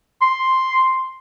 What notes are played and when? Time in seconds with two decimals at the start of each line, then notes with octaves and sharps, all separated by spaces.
0.22 C6